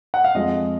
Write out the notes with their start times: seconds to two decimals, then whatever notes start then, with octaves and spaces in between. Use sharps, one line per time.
0.14 F#5
0.24 F5
0.34 F2 F3 G#3 D#5